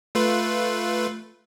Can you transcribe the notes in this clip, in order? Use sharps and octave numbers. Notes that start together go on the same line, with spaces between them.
A3 F4 B4